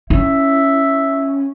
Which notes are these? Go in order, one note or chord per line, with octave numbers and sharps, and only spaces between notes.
C#4 E4 E5